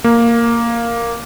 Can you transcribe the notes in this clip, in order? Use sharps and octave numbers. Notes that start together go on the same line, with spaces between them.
A#3